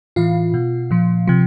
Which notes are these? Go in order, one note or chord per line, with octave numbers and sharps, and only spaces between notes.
A2 E3 F4 F5
B2
A#2 F3
C3 F3